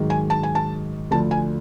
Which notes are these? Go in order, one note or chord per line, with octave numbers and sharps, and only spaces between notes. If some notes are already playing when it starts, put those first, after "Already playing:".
Already playing: G#2 D#3 F#3
G#5
A5
G#5
A5
D2 D3 F3 A5
G#5